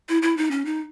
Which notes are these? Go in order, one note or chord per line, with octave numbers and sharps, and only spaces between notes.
E4
E4
D#4
C#4
D#4